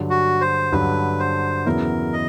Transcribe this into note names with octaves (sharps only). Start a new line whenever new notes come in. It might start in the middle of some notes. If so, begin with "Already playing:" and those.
Already playing: G2 D3 F#3
F#4
C5
G2 D3 F#3 B4
C5
E2 C#3 F#3 B3 E4 A#4
D#5